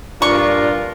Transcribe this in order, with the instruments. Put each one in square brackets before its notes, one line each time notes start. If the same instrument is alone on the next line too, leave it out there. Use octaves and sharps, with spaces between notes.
[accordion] G2 A#2 [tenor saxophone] D4 [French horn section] F4 A#4 [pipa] C#6